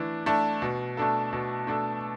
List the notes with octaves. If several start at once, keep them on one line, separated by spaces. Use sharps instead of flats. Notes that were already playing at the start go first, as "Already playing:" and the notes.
Already playing: E3 A3 D4
A3 D4
B2
A3 D4 A4
B2
A3 D4 A4